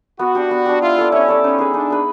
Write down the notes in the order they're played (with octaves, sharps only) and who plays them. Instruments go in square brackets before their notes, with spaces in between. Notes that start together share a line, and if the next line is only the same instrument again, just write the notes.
[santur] B3 [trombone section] F#4
[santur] D4 G4
B3
D4 G4
[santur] E4 [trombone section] F4
[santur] A4 D5
[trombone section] C#4 [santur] E4
[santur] A4 D5
[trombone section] C#4 [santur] D#4
[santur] G#4 B4
[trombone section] D4 [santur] D#4
[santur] G#4 B4